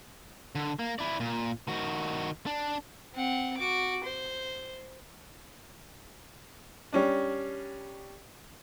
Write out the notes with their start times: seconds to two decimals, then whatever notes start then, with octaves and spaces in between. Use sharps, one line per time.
0.55 D3
0.79 A#3
0.99 E4 D5
1.20 A#2
1.68 D#3 F#4
2.46 D4
3.14 C4 F#5
3.57 F#4 D6
4.04 C5
6.93 G3 C#4 D4